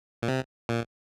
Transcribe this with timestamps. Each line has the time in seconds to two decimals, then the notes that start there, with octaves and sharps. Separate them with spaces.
0.22 A#2
0.28 C3
0.69 A#2